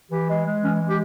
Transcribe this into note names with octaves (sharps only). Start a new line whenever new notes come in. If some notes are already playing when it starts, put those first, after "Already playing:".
E3 G4
G#3
G#3
E3 C#4
G#3
G4